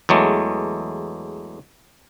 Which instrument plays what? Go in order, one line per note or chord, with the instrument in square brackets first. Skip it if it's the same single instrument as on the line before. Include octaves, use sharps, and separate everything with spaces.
[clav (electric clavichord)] E2 F#3 G#3 A3